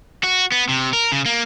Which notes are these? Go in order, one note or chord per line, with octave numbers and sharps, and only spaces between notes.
F#4
B3
C3
A#4
C#3
A#3